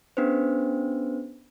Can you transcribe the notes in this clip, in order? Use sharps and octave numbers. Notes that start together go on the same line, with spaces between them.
B3 C#4 D4 G#4 B4 C5